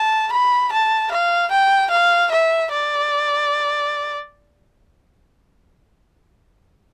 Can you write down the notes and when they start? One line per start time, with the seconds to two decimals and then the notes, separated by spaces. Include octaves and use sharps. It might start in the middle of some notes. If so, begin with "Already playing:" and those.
Already playing: A5
0.32 B5
0.72 A5
1.12 F5
1.51 G5
1.91 F5
2.32 E5
2.71 D5